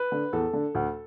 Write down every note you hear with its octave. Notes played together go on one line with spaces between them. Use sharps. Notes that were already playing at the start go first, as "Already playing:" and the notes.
Already playing: B4
D3
E2 A4
D3
D2